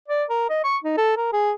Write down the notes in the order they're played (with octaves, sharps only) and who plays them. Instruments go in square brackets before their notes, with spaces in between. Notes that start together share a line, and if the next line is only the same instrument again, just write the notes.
[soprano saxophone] D5
A#4
D#5
C#6
D#4
A4
A#4
G#4